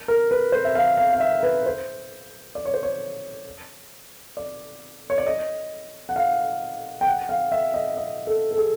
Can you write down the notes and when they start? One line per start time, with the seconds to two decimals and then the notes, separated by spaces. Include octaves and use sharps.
0.08 A#4
0.31 B4
0.52 C5
0.65 E5
0.75 F5
0.97 F5
1.13 F5
1.20 E5
1.43 B4
1.66 C5
2.55 D5
2.65 C#5
2.74 C5
2.83 C#5
4.37 D5
5.10 C#5
5.18 D5
5.27 D#5
6.09 F#5
6.16 F5
7.01 G5
7.07 F#5
7.29 F5
7.52 E5
7.74 D#5
7.97 D#5
8.27 A4
8.51 A4
8.58 G#4